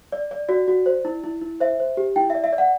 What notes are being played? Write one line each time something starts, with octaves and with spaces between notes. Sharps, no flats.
D5
D5
F#4 D5
F#4
C5
E4
E4
E4
C5 E5
C5
G4
E4 G5
D5 E5
E5
D5
F#5